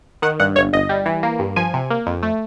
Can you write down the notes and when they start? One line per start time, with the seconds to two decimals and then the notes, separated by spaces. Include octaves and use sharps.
0.22 D#3 F#5
0.40 G2 F#5
0.56 G1 C#5
0.73 G1 D#5
0.89 G3
1.06 E3
1.23 A#3
1.39 G2
1.56 F3 G#5
1.74 C3
1.90 A#3
2.06 F2
2.23 A3